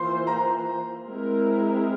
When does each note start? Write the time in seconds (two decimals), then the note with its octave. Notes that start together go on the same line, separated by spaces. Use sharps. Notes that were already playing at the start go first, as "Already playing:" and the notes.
Already playing: E3 A#3 F4 C5 C6
0.27 A#5
1.04 G#3 C4 E4 A#4